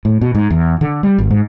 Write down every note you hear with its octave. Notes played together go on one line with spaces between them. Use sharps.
A2
B2
G#2
E2
D3
G3
G#1
G#2